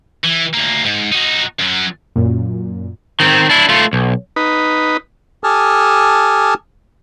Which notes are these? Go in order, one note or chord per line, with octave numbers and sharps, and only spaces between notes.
E3
D2 A#3
G#2
D#4 F#4
F#2 F#3
F#2 A#2
D#3 C4
D4 E4
A3 F4
B1
D#4 B4
G4 A4 G#5 A5 D#6 F6